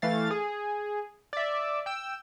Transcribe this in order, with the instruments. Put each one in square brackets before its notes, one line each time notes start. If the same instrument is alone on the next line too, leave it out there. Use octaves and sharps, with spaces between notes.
[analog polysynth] E3 A3 F5 A6
G#4
D5 E5
G5 E6